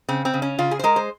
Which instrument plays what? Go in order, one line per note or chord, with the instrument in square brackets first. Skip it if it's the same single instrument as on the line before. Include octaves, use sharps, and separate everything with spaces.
[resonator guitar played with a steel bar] C#3 C4
C4
C#3
C#4
C#3 F4
G#4
C5
G#3 A#4
C5